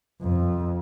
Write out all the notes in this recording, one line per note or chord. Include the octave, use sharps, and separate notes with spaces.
F2